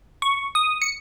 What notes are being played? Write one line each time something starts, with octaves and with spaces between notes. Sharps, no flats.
C#6
D#6
C#7